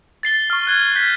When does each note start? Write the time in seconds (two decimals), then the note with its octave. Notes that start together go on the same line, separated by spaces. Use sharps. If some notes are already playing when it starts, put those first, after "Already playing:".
0.23 A6 C7 G7
0.50 C#6 F6
0.67 F#6 G#6 G7
0.96 G6 B6